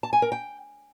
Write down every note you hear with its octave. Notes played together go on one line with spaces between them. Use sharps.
A5
G#5
A#4
G5